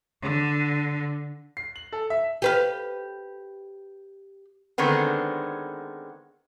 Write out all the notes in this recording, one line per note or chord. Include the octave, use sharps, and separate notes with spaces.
D3
C7
F#7
A4
E5
G4 B4 F5
D3 D#3 G#3 B3 C4